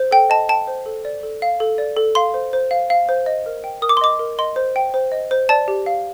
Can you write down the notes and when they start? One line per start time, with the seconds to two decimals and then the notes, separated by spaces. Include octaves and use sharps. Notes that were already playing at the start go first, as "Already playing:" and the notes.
Already playing: C5
0.11 A4 G5
0.30 D#5 A5
0.49 G5 A5
0.68 C5
0.86 A4
1.05 D5
1.23 A4
1.42 F5
1.60 A4
1.78 D5
1.97 A4
2.15 F5 C6
2.34 C5
2.53 C5
2.71 F5
2.90 F5
3.09 C5
3.26 D#5
3.46 A#4
3.64 G5
3.82 A#4 D#6
3.89 D6
3.97 C6
4.01 D#5 D6
4.19 A#4
4.39 D#5 C6
4.56 C5
4.76 G5
4.94 C5
5.12 D#5
5.31 C5
5.49 D5 A5
5.68 G4
5.86 F5